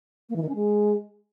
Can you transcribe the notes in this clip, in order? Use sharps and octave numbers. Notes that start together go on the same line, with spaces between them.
A#3
E3
D#3
C#4
G#3